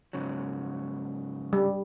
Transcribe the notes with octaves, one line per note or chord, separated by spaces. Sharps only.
G#2 C#3 F#3
G3